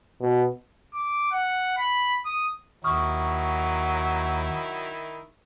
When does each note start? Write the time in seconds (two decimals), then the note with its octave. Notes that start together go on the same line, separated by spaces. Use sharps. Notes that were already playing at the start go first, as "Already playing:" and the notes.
0.20 B2
0.94 D6
1.31 F#5
1.77 B5
2.25 D#6
2.84 D#2 D#3 F#3 E4 C#6 D#6 F6